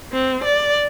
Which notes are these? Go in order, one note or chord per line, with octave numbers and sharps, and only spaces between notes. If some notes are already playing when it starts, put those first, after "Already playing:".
C4
D5